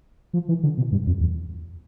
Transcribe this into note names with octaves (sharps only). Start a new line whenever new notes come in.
F3
E3
D3
B2
G2
F2
E2